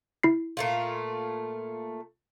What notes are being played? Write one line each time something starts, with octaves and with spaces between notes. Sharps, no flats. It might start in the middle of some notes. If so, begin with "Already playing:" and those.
E4 C7
A#2 A3 F4